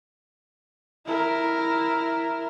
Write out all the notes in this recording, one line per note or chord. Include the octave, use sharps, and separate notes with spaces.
E4 A#4